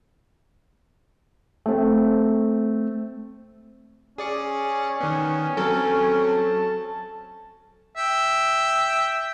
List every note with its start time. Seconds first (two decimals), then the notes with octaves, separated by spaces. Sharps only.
1.66 A3 C4
4.18 C#4 G#4 D5 C#7
5.01 D#3 B3
5.57 F#3 C4 A4
6.27 A5
7.96 E5 G5